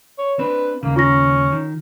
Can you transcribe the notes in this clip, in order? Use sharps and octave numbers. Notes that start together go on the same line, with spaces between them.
C#5
C4 D4 B4
D#2 C#3 A#3
C#4 F4 A#6
D#3